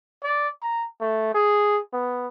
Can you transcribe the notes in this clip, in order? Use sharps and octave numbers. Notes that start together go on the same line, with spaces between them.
D5
A#5
A3
G#4
B3